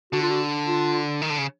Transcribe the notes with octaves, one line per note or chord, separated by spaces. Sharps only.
D3 F#4
F4
F#4
F4
D#3
D3
C#3